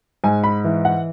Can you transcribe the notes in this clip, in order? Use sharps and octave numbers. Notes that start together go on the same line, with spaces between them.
G#2 G#5
B5
E3
F#5